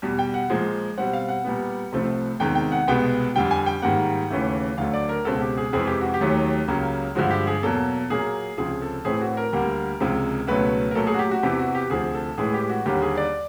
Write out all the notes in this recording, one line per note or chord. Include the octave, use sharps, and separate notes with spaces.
E2 B2 G3
G5
F#5
A#2 F3 G#3
B2 G3 C4 F#5
F5
F#5
A#2 G3 B3
C2 C3 F3 A3 C4
E2 C3 D#3 G#3 G5
G5
F#5
C2 B2 G#3 B3 G5
F2 D3 G3 G5
G#5
G5
G#2 D#3 G3 A#3 F#5
D#2 C#3 E3 A3
D2 D3 F#3 A3 F5
D5
A#4
C#2 B2 G#3 C4 A4
G4
G#4
F2 C3 E3 G#3 C4 G#4
G4
F#4
G4
D#2 D#3 F#3 A3
C#2 C#3 F#3 A#3
G2 D3 F3 G#3 F#4
G4
G#4
E2 B2 F#3 A#3 A4
A#2 F#3 A#3 G#4
C#2 C3 F3 G#4
A4
A2 E3 A3 C4 G#4
F#4
A#4
D2 D3 G3 A#3
C#2 C3 F3 G#3
C#2 B2 F#3 A3 B4
A#4
A#2 F#3 A3 A4
G#4
F#4
G4
F#4
E2 C3 E3 G4
F#4
G4
D2 C3 F3 G#4
A4
A2 E3 G#3 G#4
G4
F#4
D#2 D3 G3 A#3 G4
G#4
D5